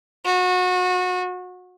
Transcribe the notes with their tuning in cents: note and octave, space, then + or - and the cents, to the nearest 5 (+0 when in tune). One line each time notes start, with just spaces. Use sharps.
F#4 -30